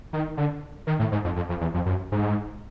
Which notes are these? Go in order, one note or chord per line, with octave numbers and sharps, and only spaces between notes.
D#3
D3
D#3
A2
G#2
F2
F2
F2
E2
F2
F#2
G#2